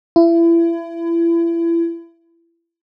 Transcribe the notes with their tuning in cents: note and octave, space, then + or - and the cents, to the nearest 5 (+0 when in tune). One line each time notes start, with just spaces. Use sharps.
E4 +30